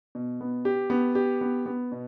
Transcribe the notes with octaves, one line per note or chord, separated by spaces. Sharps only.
B2
B3
G4
B3
G4
B3
B3
B2